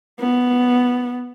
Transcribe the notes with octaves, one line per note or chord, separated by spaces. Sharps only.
B3